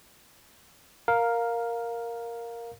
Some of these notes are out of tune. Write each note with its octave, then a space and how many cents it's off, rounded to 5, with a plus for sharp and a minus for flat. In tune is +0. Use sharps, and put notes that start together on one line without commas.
A#4 +0 F5 +10